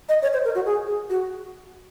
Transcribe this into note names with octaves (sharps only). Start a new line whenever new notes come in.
D#5
C#5
C5
A#4
F#4
G#4
G#4
F#4